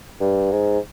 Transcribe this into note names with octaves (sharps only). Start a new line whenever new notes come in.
G2
G#2